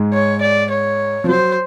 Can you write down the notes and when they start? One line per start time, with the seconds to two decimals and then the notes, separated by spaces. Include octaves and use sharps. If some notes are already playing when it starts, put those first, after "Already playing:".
Already playing: G#2 G#3
0.13 C#5
0.42 D5
0.71 C#5
1.24 F3
1.28 F#3 C5